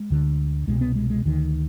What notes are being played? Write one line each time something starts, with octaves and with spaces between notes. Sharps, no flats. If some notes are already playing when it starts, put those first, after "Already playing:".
Already playing: G#3
D2 D3
C2 B2 G#3
B3
G#3
G#3
D2 D3 D#3